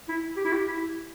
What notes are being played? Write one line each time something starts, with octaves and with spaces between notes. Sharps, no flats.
E4
G4
E4
G4
E4